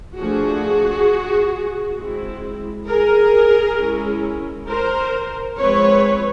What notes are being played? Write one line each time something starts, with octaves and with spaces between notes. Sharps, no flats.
F3 A3 D4 F#4 G#4
G#3 C4 E4
G#4 A#4
G#3 C#4 E4
A#4 C5
F3 G#3 C4 B4 C#5